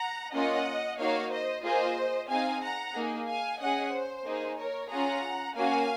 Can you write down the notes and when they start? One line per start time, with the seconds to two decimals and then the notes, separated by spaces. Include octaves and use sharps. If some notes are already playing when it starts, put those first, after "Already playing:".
Already playing: F#5 A#5
0.34 A#3 C#4 F4 D#5 F#5
0.99 A#3 D#4 F#4 C#5 F5
1.32 C5 D#5
1.64 A#3 F4 G#4 C5 D#5
2.29 C4 D#4 G#4 F5 G#5
2.63 F#5 A#5
2.95 A#3 D#4 G#4
3.28 F5 G#5
3.60 C#4 G#4 D#5 F#5
3.93 C5
4.25 A#3 D#4 G#4
4.57 A#4 C#5
4.90 C#4 F4 G#4 F#5 A#5
5.56 A#3 C#4 F#4 F5 G#5